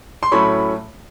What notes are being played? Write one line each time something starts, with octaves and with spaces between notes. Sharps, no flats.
C6
A2 F#3 A3 C#4 B5 C#6